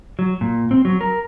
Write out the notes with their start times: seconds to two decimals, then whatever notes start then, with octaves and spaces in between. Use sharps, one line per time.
0.19 F#3
0.41 A#2
0.71 C4
0.85 F#3
1.01 A#4